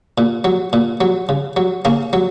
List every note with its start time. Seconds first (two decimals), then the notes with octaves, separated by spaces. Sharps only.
0.18 A#2
0.44 F#3
0.73 A#2
1.01 F#3
1.29 C#3
1.57 F#3
1.85 C#3 A#3 C#4
2.13 F#3